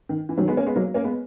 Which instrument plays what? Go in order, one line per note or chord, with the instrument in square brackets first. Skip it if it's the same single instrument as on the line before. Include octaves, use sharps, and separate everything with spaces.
[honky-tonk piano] D#3
E3
D#3 F#3
G#3 B3
A#3 C#4
G#3 B3
F#3 A#3
A#3 C#4
G#3 B3